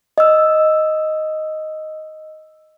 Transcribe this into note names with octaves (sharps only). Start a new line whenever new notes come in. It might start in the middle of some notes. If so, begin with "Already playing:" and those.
D#5 E6